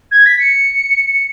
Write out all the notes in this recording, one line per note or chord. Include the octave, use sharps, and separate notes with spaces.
G#6
B6
C#7